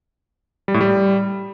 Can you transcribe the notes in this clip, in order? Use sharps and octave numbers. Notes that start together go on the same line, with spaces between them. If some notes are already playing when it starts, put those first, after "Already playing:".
G3
A2
G3